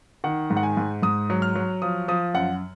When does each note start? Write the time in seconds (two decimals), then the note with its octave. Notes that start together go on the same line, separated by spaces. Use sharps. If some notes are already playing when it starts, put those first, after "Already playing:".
0.24 D#3 F#5
0.50 G#2
0.57 F#5
0.63 G#5
0.77 G#2
1.02 G#2 D#6
1.30 F#3
1.42 F6
1.55 F#3
1.82 F3 D#6
2.08 F3 D#6
2.34 F#2 F#5